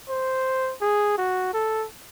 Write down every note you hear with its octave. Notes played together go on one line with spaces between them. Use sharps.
C5
G#4
F#4
A4